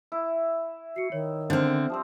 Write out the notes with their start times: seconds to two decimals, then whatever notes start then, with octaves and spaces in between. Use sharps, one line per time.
0.12 E4
0.96 F#4 C7 C#7
1.12 D#3 C#5
1.50 D3 C4 D4 C5 F6
1.90 F3 G3 C4